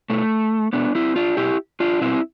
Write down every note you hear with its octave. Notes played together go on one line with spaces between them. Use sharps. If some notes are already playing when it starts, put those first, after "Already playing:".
B2 A3
B2 B3 D4
C4 E4
D4 F4
B2 E4 G4
D4 F4
B2 C4 E4